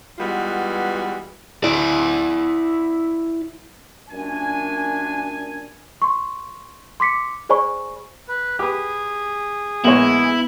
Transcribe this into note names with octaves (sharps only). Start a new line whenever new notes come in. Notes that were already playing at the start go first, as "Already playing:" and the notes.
E3 G3 G#3 B3 F4 F#4
E4 D5
F#2 A#2 D4 G#5
C6 C#6
C6 D6 B6 C#7
G#4 C5 D5 G#5 B5 C#6
B4
G4 G#4 B4
A#1 G#3 B3 E4 C#5